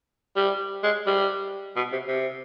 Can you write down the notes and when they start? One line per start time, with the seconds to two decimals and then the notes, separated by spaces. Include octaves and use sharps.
0.36 G3
0.83 G#3
1.07 G3
1.76 B2
1.92 C3
2.08 C3